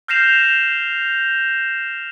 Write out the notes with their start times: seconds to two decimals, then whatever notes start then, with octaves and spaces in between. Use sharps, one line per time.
0.08 F6 G6 A#6 C7 E7 F7